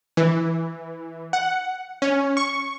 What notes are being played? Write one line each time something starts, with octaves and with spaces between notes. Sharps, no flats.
E3
F#5
C#4
C#6